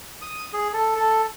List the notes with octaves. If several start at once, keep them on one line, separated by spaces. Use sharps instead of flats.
D#6
G#4
A4
A4